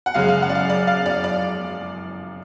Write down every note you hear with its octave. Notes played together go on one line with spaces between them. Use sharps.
F#5
F#2 C#3 G#3 F5
F5
F#5
D5
F5
D5
F5
D5
D5